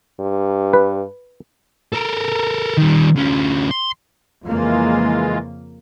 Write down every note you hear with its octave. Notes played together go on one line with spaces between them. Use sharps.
G2
B4
A4 A#4
D#3 G3
D2 C#4
C6
F2 C#3 E3 G#3 A#3 F4